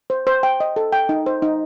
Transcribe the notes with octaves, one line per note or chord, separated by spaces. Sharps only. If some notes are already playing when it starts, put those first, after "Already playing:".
C5
C5
G5
D#5
A4
G5
D#4
C5
D#4